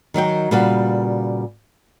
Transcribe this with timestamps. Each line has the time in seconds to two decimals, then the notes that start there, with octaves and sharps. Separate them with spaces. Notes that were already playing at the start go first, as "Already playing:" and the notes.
0.14 D#3 F#3 D#4 G5
0.51 A#2 C#3 G3 F#4 B4 F5